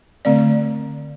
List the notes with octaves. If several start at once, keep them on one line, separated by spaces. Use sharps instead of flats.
D3 A3 C4 D5